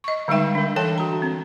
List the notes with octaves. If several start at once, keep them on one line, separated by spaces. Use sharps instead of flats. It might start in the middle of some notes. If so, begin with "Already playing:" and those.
D#5 C#6
D3 G3 G#3 D#4 E5 G5
D4 A#4
E3 A4 C#5 G5 A5
F#4 A#5
C4